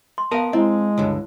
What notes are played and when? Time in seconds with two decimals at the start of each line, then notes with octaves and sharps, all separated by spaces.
0.18 C6
0.31 B3 A#4 D#5 F5 A5
0.53 G#3 C4 E4 D#5
0.98 C#2 G2 D3